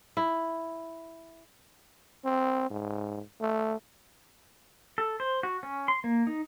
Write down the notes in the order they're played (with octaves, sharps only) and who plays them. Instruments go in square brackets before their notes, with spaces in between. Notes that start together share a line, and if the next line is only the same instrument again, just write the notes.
[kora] E4
[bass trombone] C4
G#2
A3
[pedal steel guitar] A4
C5
F#4
C#4
C6
A#3
D#4